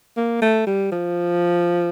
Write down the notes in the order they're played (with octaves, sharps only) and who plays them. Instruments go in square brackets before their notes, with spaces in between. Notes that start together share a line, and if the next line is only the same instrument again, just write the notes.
[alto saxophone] A#3
A3
G3
F3